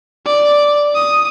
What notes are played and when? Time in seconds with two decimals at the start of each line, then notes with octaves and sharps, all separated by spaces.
0.26 D5
0.95 D#6